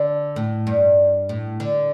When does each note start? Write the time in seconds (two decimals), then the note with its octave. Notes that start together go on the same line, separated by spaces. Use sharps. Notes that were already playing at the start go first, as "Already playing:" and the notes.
Already playing: D3
0.36 A2
0.67 G2
1.29 A2
1.60 D3